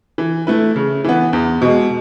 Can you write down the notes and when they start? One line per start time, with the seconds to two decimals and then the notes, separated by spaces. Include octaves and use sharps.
0.18 E3
0.47 A3 E4 B4
0.76 C#3
1.04 E3 B3
1.33 E2
1.62 B2 G#3